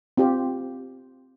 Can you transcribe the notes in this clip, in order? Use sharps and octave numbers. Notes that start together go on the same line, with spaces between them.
C4 F4 G4